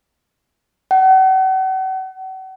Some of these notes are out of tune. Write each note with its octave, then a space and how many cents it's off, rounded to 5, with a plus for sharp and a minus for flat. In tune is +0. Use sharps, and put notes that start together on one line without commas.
F#5 +40